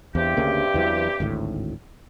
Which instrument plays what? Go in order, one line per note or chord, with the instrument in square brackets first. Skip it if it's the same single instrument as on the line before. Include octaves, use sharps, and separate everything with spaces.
[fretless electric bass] E2 [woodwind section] G2 C3 G4
[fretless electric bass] D2 C#3 A#3
E2 E3 F#3
G#1 D2 A2